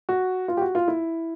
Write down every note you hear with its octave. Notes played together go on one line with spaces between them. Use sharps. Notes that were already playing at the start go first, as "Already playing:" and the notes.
F#4
F4
G4
F#4
F4
E4